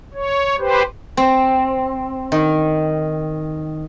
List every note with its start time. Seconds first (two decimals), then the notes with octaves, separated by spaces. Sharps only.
0.14 C#5
0.59 G4 B4 C5
1.17 C4
2.32 D#3